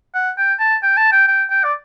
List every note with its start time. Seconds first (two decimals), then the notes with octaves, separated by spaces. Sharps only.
0.14 F#5
0.38 G5
0.60 A5
0.83 G5
0.97 A5
1.12 G5
1.28 G5
1.50 G5
1.64 D5